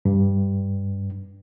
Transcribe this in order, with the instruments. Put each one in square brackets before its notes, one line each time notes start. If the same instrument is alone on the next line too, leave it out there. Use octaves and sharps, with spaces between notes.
[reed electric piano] G2